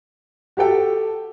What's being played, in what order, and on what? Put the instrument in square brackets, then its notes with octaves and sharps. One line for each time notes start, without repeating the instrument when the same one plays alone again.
[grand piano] F#4 G4 A4 G5